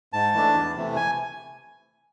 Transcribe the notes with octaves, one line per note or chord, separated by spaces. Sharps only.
G#2 A5
E3 A3 D4
E2
C3 E3 A3
G#5